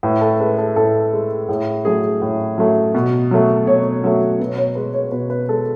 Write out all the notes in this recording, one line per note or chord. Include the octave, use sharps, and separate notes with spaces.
A2 B4
A4
G#3 B4
A4
A2 A4
G#3
A2 G#4
F#3 A3 G#4
A2
F#3 A3
B2
F#3 A3
B2 C#5
F#3 A3
B2 B4
C#5
G#3 B4
C#5
B2 B4
B4
G#3 A4